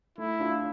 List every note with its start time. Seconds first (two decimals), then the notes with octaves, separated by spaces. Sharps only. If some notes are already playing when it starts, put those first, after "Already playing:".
0.18 A3 E4
0.40 D4 F4